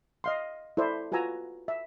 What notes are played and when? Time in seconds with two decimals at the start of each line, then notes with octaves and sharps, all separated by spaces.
0.24 D#5 F5 C6
0.77 E4 A4 C5 D5
1.12 F4 F#4 B4 G#5 A#5 E6
1.68 E5